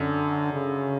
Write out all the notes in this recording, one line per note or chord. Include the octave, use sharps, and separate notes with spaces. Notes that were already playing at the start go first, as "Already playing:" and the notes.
Already playing: F#2 D3
C#3